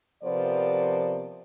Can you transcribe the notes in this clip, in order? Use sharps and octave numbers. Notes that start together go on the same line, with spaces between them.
C3 F3 B3 A#4 C5 D5